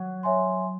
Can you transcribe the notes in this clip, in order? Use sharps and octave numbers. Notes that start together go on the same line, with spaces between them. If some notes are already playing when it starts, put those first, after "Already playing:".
Already playing: F#3
C#5 E5 G#5 C6